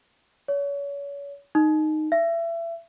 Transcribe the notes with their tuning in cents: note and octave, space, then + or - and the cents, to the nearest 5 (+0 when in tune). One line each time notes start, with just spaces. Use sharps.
C#5 +35
D#4 -10
E5 +30